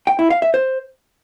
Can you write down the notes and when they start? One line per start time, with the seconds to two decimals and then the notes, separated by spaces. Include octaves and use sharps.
0.07 G5
0.19 E4
0.30 F5
0.42 E5
0.54 C5